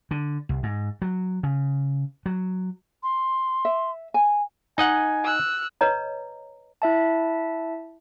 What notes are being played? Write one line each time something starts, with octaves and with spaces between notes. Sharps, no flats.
D3
C2
G#2
F#3
C#3
F#3
C6
E5
G#5
D#4 D#5 F#5 G#5
E6 F#6
B4 C#5 D#5 A#5
E4 E5 A5